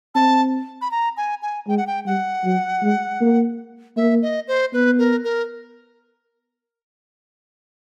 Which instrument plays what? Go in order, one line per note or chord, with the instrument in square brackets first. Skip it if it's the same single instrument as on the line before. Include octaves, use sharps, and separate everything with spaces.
[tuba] C4 [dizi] A5
[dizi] B5
A#5
G#5
G#5
[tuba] G#3 [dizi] G5
[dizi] F#5
G5
[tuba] G3 [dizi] F#5
[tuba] F#3
G#3
A#3
[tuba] A#3 [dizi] E5
[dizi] D#5
C5
[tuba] B3 [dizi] B4
[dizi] A#4
A#4